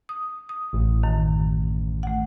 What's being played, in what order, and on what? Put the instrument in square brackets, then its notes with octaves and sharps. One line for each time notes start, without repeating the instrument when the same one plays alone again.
[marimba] D#6
D#6
[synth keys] A1
[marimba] F#2 D#3
A3 F#5